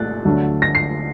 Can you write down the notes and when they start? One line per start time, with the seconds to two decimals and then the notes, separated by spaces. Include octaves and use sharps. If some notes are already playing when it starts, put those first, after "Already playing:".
Already playing: C2 A#2 A3 F#6 A6
0.25 D2 D3 F#3 A3
0.62 A#6
0.75 C7